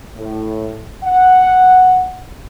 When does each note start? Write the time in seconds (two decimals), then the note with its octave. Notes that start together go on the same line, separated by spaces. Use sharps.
0.17 A2
1.04 F#5